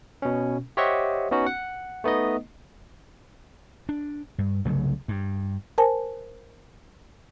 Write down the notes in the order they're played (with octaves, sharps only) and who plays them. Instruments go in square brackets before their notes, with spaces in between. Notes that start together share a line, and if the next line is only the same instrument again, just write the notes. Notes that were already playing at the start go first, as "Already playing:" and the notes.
[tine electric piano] B2 C#4
G4 C5 C#5 D#5 E5 F#5
B3 C#4 D#4 F#4
F#5
A3 B3 D#4 D#5
[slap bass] D4
G2
C2 C#3 F#3 A3
G2
[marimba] A#4 C5 G#5 A5